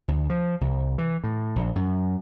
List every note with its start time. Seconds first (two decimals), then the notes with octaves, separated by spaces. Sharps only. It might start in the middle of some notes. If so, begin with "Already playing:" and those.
0.08 D2
0.30 F3
0.61 C2
0.98 E3
1.24 A2
1.56 A#1
1.76 F#2